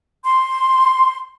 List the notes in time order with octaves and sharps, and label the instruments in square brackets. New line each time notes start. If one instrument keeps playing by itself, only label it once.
[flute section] C6